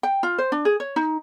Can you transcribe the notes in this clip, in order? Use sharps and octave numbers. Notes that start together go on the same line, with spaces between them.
G5
F4
C5
D4
G#4
C#5
D#4